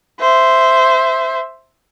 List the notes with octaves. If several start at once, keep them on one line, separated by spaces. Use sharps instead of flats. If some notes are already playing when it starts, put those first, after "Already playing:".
C5 E5